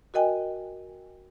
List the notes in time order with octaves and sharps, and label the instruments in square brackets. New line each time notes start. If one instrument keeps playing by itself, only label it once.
[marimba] F#4 A#4 D#5 G5 G#5